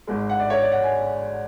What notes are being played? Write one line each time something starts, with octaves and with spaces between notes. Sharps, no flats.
G#1 G#2 G#3
F#5
D5
C#5
D5
F#5
G#5